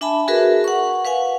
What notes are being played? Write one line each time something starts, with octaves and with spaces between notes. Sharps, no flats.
D4 E5 G#5 A5 B5
F#4 G#4 A#4 B4 E5
F#5 C#6
B4 F5 F#5 G#5